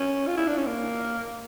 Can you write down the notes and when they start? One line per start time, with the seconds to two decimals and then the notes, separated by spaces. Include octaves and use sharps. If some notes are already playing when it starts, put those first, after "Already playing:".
Already playing: C#4
0.27 F4
0.37 E4
0.48 D4
0.57 C#4
0.67 A#3